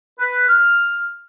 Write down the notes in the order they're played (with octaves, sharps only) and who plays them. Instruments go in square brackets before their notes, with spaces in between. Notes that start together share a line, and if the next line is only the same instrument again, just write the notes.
[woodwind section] B4
F6